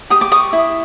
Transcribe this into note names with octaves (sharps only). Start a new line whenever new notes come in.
G4 D#6
D6
C#6 D#6
E4